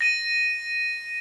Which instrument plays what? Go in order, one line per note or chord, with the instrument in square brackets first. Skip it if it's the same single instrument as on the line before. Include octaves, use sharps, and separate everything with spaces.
[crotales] A#6 D#7